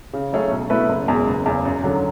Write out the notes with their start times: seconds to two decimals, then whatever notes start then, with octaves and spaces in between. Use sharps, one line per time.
0.13 C#3
0.33 F#3 A3 C#4 G#4
0.51 B1
0.70 B2 A3 E4 B4
0.89 F#1
1.08 E2 B2 G#3
1.27 F#1
1.46 E2 C#3
1.65 F#2
1.83 D3 F#3